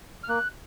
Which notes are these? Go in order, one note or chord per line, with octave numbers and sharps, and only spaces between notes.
F6
A#3 F#6